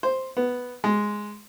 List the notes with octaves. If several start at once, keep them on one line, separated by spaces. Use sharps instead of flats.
C5
B3
G#3